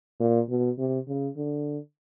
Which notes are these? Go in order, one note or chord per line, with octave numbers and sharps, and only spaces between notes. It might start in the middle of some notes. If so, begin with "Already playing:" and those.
A#2
B2
C3
C#3
D3